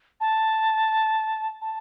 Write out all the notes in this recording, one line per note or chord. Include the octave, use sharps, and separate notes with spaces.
A5
A5